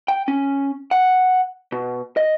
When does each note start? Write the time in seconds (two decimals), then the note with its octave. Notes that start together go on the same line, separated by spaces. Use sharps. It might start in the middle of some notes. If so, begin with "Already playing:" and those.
0.08 G5
0.28 C#4
0.91 F#5
1.72 B2
2.17 D#5